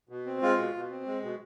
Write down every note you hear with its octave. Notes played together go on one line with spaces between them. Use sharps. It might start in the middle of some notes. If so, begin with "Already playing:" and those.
B2
C4
G#3 F4
B2
B2
C4
G#3
B2